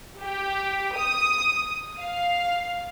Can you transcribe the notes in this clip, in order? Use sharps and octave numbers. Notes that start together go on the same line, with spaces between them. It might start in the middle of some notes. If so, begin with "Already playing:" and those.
G4
D#6
F5